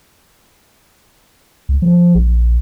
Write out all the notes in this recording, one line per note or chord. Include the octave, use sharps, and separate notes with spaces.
C#2
F3
A#1